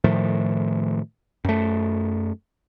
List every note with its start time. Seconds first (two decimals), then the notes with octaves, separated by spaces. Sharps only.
0.04 A2 D#3 F3 A3
1.45 F#2 A3